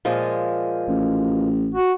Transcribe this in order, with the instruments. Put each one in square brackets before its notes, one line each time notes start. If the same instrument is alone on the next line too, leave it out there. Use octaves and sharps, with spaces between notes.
[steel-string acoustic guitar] A#2 F3 G#3
[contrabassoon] A1
[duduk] F#4